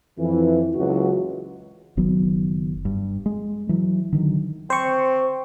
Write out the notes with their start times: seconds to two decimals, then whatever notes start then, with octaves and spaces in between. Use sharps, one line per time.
0.18 F2 E3
0.75 F#1 C#2 E3 F#3 F#4
1.97 F#1 D#3 F#3 B3
2.85 G2
3.26 G#3
3.69 E3 F#3
4.12 D3 D#3 F#3
4.70 C4 C5 C#6